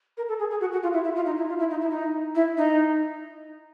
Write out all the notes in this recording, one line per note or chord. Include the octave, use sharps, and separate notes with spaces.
A#4
A4
G#4
G#4
F#4
F#4
F4
E4
E4
F4
D#4
E4
F4
E4
D#4
E4
D#4
E4
D#4